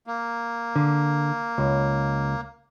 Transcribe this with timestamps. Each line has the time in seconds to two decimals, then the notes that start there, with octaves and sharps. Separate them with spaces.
0.07 A#3
0.76 D3
1.58 C#2